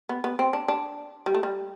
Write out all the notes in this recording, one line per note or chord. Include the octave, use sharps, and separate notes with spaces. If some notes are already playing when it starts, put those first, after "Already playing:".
B3
B3
C4
D4
D4
G3
A3
G3